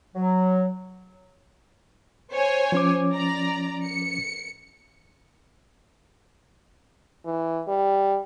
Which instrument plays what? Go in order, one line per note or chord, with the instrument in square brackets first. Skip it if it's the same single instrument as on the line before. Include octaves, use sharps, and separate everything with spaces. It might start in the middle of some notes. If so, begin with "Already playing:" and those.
[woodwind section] F#3
[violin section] C5 C#5 G#5
[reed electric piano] F3 C#4 D6
[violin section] D5 A#5
C#7
[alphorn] E3
G3